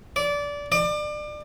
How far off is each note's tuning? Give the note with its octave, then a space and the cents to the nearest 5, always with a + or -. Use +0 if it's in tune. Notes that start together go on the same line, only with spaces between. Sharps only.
D5 -20
D5 +30